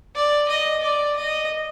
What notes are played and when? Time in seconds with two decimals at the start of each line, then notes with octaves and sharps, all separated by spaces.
0.15 D5
0.49 D#5
0.83 D5
1.16 D#5